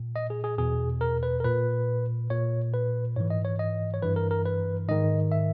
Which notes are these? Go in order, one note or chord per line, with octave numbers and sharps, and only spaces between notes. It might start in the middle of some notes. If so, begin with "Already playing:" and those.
Already playing: A#2
D#5
G#4
G#4
E2 B2 G#4
A#4
B4
A#4
A#2 B4
A#2 C#5
B4
G#2 E3 C#5
D#5
C#5
D#5
C#5
G2 E3 B4
A#4
A#4
B4
G#2 D#3 D#5
E5